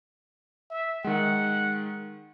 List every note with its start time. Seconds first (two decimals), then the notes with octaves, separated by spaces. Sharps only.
0.70 E5
1.04 D#3 G#3 F#5